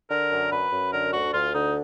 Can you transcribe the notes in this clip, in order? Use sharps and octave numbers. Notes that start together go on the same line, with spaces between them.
D3 A#4
F#2
F#2 B4
F#2
D3 A#4
D2 F#4
D2 F4
D3 D#4